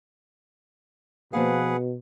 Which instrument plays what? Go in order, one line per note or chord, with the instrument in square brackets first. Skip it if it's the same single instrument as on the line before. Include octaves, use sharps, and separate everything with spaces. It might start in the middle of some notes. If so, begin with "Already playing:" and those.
[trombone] B2 [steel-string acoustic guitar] F3 A#3 F5 [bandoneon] G#4 B4 F#5